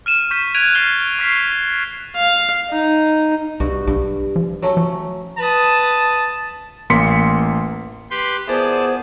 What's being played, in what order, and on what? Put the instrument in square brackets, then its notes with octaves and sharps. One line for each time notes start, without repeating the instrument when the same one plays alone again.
[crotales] F6 D#7 E7
C#6 G6 B6 D#7 E7
F#6 G#6 D7 D#7 F7
F6 A6 B6 C7 F7 G7
C#6 F6 B6 C7 D#7
[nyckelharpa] F5
D#4
[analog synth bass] C2 [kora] G2 F#4
[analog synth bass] B1 [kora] G2
[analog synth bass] F3
[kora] F#3 A3 C#4
[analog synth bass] F3
[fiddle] B4 D#6 [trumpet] A5
[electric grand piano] A1 A#3 C6 B6 C#7
[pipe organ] G4 B4 C6
[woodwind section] A#2 E3 B3 [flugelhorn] G#4 [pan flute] C5 [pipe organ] D5 A5